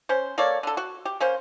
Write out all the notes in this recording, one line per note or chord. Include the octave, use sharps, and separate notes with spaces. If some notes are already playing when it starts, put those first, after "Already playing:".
C#4 C5
A#3 A4 C#5 D5
D3 A4
F#4
G4
A#3 C#4 C5